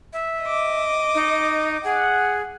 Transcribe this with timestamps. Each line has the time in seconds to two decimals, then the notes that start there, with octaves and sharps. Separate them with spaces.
0.13 E5
0.42 D#5 D6
1.15 D#4
1.84 G#4 F#5